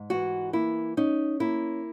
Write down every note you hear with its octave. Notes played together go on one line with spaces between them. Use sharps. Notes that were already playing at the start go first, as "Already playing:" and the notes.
Already playing: G#2
E3 F#4
A#3 E4
C#4 D#4
A#3 E4